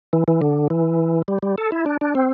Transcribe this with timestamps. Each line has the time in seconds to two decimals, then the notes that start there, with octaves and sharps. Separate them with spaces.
0.13 E3
0.28 E3
0.42 D3
0.70 E3
1.28 G3
1.43 G3
1.58 A4
1.72 E4
1.86 D4
2.01 D4
2.15 C4